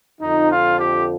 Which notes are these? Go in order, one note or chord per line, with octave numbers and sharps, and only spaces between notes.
F2 D3 F3 D#4
F4
G4